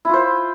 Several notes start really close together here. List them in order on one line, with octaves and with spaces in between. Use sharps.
E4 F4 C5